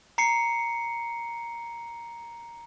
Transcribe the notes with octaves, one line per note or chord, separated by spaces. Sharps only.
A#5 C7 C#7